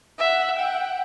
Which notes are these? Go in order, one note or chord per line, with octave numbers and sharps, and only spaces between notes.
E5 F#5
F#5 G5